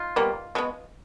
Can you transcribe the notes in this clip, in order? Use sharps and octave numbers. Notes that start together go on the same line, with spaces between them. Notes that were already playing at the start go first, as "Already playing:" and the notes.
Already playing: D#4 F4
B2 G3 A#3
B2 G#3 B3